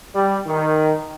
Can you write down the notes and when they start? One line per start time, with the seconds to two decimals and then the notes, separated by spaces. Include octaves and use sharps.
0.15 G3
0.47 D#3